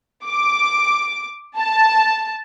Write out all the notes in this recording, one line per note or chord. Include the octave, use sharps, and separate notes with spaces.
D6
A5